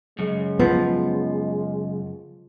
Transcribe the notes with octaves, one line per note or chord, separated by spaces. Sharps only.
F#2 C#3 G#3
F3 B3